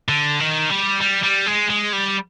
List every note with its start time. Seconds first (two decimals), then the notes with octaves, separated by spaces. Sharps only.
0.09 D3
0.40 D#3
0.69 G3
1.00 G3
1.23 G3
1.46 G#3
1.70 G#3
1.93 G3